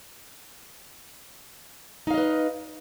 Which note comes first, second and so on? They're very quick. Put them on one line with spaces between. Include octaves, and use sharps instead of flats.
D#4 F5 D#5 B4